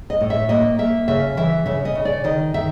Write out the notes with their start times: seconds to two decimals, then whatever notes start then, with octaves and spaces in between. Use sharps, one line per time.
0.10 D#5
0.21 A2
0.30 E5
0.49 A#3 D#5
0.78 A#3 E5
1.08 C#3 E5
1.37 E3 E5
1.66 C#3 E5
1.85 D#5
1.95 C#3
2.05 D5
2.24 D#3 D#5
2.54 D#3 E5